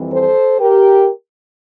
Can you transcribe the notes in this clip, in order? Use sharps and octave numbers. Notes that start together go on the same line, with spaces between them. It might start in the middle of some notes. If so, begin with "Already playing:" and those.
Already playing: F2 E3 G3 C4
A4 C5
G4 A#4